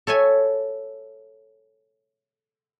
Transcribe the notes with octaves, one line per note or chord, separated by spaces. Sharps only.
A4 C#5 E5 G#5